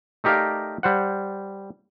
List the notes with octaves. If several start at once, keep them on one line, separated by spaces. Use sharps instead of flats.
A3 D#4 G4 A#4 D5 F5
G3 C5 F#5